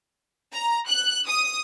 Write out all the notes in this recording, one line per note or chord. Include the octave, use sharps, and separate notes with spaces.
A#5
F#6
D#6